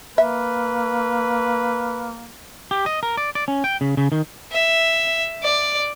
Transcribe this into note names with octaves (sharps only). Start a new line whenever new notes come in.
A#3 B4 E5
G4
D#5
A#4
D5
D5
C#4
G5
C#3
C#3
D#3
E5
D5